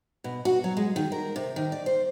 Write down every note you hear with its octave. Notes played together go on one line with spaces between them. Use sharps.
B2
F#4
F#3
G#3
D#3
A#4
C3
D#3
D5
C5